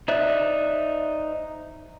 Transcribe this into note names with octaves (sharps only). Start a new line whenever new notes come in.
D#4 C5 D5 E5 F#6